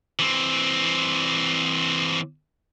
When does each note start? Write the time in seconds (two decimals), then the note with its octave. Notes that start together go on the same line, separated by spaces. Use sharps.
0.19 E3 C4